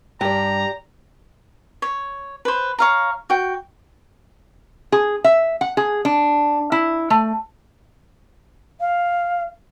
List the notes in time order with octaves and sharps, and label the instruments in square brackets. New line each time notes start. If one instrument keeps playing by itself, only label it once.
[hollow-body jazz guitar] G2 [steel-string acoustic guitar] G4 D5 [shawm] A#5
[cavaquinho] C#5
B4 C5
C#5 F5 A#5
F#4 G5
[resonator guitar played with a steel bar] G#4
E5
F#5
G#4
D4
E4
A3
[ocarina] F5